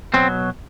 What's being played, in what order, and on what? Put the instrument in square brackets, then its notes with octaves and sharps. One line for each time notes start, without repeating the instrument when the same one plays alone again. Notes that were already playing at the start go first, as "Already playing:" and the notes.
[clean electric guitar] B2 F#3 C4